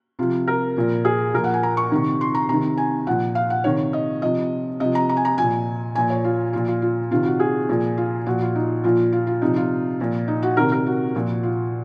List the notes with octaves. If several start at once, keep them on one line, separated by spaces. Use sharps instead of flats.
C3 F3 F4
A#4
A#2 F3
G#4
A#2 F3 A#4
F#5
G#5
A#5
C#6
C3 D#3
C6
A#5
C3 D#3 A#5
G#5
A#2 F3 F#5
F5
F#5
C3 D#3 C#5
D#5
C3 F3 D#5
C3 F3 D#5
A#5
A#5
G#5
A#5
A#2 F3 G#5
A#2 F3 G#5
C#5
F4
A#2 F3 F4
F4
F4
C3 D#3 F4
F#4
G#4
A#2 F3
F4
A#2 F3 F#4
F4
D#4
A#2 F3 F4
F4
F4
C3 F3 D#4
F4
A#2 F3
D#4
F#4
C3 D#3 A#4
A#4
F#4
A#2 F3
F4